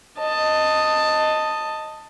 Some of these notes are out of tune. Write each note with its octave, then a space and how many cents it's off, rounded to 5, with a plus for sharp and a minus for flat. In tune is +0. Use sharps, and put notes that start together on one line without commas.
D#5 +0 A5 +15